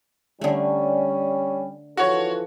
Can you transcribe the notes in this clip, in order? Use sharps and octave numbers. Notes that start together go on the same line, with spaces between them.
D3 G3 A3 C#4
E3 F3 F#4 A4 C#5